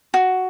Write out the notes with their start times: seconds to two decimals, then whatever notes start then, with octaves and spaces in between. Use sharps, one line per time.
0.14 F#4